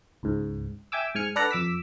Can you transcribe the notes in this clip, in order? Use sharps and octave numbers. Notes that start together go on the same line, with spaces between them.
C#2 G#2
E5 G5 G#5 D6 E6
G#2 G#5 F6 C#7
D4 A4 B4 D5 F#5 A#5
F2 D6 E6 B6